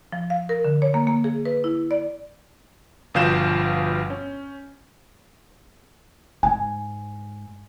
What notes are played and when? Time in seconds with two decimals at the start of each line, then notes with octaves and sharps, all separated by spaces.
0.12 F3
0.30 F5
0.49 A#4
0.65 D3
0.82 C#5
0.94 A#3
1.07 A#3
1.24 G#4
1.45 B4
1.64 E4
1.91 D5
3.14 G1 B2 F3 F5 G6 E7
4.10 C#4
6.43 G#2 G#5